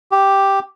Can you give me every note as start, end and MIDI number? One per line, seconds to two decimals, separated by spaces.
0.12 0.59 67